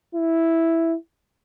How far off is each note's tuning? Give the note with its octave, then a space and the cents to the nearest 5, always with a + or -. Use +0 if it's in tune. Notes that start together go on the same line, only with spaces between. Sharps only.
E4 +0